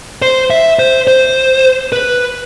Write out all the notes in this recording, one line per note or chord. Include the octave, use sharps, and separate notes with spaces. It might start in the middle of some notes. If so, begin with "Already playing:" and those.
C5
E5
C5
C5
B4